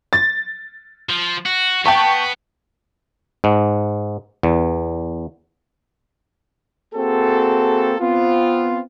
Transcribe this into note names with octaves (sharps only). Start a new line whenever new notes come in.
A6
F3
F#4
B3 G5 A5 C#6
G#2
E2
A#3 C4 F#4 G#4 A4
B3 C4 F4